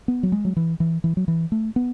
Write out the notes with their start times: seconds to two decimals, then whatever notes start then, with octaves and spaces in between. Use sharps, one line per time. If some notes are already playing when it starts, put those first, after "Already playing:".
0.08 B3
0.23 F#3
0.32 G#3
0.45 F#3
0.56 E3
0.80 E3
1.04 E3
1.17 F#3
1.28 E3
1.52 A3
1.76 B3